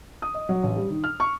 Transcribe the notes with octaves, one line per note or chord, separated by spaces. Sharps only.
D#6
D#5
F#3
A1
G3
D#3
F6
C#6